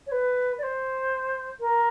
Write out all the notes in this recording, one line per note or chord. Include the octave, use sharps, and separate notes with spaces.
C#5
B4
D5
C5
A#4